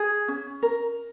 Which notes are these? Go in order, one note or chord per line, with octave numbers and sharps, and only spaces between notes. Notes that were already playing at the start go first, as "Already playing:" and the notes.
Already playing: G#4
C#4
A#4